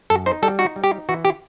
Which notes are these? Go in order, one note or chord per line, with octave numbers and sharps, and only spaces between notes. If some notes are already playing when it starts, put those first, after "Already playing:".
F#2 A4
D#4 C5
G3 A4
D#4 F#4
G3
G4
D#4
E3 F#4
G4